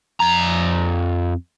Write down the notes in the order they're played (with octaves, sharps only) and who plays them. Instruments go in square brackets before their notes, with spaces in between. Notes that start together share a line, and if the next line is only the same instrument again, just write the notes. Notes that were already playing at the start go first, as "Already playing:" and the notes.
[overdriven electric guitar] F2 A#5